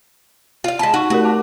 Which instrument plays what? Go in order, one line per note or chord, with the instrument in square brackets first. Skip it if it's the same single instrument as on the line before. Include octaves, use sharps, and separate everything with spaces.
[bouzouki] F4 F5
[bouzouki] G#3 A5 [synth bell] B5 B6
[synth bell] D#4 C#6 [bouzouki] F#4
[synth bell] A3 G4 A#4 [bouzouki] F#4
[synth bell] F#5 A5 D6